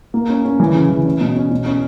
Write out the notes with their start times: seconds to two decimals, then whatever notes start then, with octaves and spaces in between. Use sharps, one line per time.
0.14 A#3
0.30 C#4
0.45 C#4
0.60 E3
0.75 C#3
0.90 E3
1.05 C#4
1.21 B2
1.36 C#4
1.51 B2
1.66 C#4